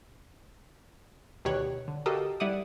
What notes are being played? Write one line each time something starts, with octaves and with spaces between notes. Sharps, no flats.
D2 B2 D#3 G4 C#5 F#6
D3
F#4 G4 A4 A#4 D#5 F5
G3 E4 F#5 D6 D#6